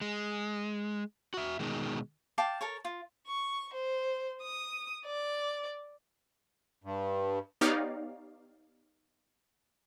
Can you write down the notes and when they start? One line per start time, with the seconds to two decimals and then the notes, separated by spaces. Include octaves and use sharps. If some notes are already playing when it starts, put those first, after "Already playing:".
0.01 G#3
1.34 F#4 E5
1.60 B2 D#3 G#3
2.38 F5 G5 A5 D6
2.61 A4 A#4 C#5
2.85 F4
3.27 C#6
3.74 C5
4.42 D#6
5.06 D5
6.84 G2
7.61 B3 D#4 G4 C#5 D5 F5